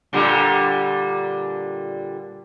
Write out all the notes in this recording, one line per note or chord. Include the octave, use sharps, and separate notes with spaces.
A#2 D3 G3